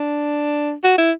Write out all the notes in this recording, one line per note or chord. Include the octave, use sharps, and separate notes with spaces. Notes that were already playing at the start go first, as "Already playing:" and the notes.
Already playing: D4
F#4
E4